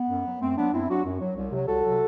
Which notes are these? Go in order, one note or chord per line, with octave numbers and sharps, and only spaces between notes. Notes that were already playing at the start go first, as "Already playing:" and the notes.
Already playing: B3
F#2
F#3
F#2 A3 C4
F#3 B3 D4
F#2 C4 E4
F#3 D4 F#4
F#2
F#3
C2
C3 F#3
C2 F#4 A4
C3 F#3